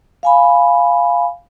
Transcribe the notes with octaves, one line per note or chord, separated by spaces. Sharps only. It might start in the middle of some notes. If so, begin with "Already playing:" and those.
F5 G#5 B5